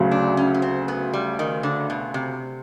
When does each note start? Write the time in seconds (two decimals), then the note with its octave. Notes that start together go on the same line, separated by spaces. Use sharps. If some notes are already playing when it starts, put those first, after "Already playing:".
Already playing: D2 C#3 F#3
0.11 D4
0.37 C#4
0.54 C#4
0.62 C4
0.88 B3
1.13 G3
1.39 D#3
1.63 D3
1.90 B2
2.14 C3